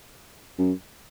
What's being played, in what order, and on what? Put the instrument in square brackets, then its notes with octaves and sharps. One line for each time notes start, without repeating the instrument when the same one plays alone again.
[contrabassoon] F#2